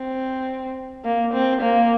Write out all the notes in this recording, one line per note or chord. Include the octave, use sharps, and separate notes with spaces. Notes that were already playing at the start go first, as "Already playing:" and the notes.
Already playing: C4
A#3
C4
A#3